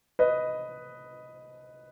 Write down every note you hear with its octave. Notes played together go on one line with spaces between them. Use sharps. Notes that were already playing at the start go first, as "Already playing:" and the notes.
B4 D#5